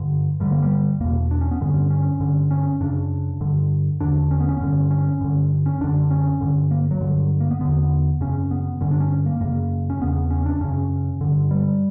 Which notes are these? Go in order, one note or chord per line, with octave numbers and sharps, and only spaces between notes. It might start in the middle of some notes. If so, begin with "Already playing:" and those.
Already playing: G2 D3
G2 D3 G3
A#3
G3
E2 B2 A#3
D4
C#4
B3
G2 D3 C#4
C#4
G2 D3
C#4
F#2 C#3 D4
G2 D3
E2 D3 D4
C#4
B3
C#4
G2 D3
C#4
G2 D3
C#4
F#2 D3 D4
C#4
G2 D3
A#3
F#3
G2 D3
A#3
B3
E2 D3 B3
F#2 C#3 C#4
B3
G2 D3 C#4
D4
C#4
A#3
F#2 C#3 A#3
C#4
E2 C#3 B3
C#4
D4
F#2 C#3 C#4
G2 D3
G3